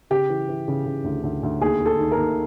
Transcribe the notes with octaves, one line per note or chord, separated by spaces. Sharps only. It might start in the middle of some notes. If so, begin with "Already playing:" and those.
C#3 G4
E3
E3
C#3
C#3
D2
D2
D2
D#2 G#4
D#2
A4
D#3
A#4
D#2